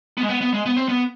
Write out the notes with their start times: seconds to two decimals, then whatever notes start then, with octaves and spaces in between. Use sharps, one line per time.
0.18 B3
0.23 G#3
0.29 B3
0.41 B3
0.54 G#3
0.66 B3
0.77 C4
0.89 B3